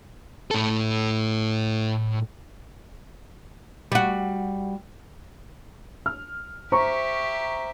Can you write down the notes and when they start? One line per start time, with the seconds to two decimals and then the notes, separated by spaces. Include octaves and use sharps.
0.51 A2 A4
3.92 G3 F#4
6.06 F6
6.72 G4 C5 E5 A#5 C#6